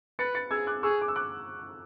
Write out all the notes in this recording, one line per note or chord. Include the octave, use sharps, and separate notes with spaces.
B4 A6 C#7
A6 C#7
G#4 E6 G#6
D6 F#6
G#4 C#6 E6
D6
E6
D6 F#6